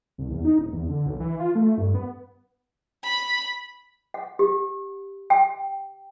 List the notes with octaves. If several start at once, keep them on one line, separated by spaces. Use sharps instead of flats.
C2
E2
D#4
D#1
E2
D3
B1
E3
F4
A3
G2
B3
B5
F#5
G4
G5